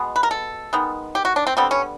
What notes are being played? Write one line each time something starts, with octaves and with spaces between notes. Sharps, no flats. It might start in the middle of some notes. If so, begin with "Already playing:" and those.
Already playing: B2 G#3 B3
B4
A#4
A4
D#3 G#3 B3
G4
F#4
D4
C4
D3 G3 B3 C4
C#4